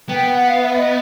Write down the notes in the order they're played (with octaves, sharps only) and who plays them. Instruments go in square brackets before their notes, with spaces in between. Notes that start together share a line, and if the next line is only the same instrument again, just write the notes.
[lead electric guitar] B3 [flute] G5
[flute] F#5
F5
E5
D#5